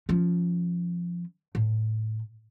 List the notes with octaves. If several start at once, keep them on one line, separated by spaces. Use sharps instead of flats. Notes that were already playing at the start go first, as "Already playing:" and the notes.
F3 C#4
A2